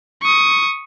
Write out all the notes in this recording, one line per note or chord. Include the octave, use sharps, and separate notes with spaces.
C#6 D#6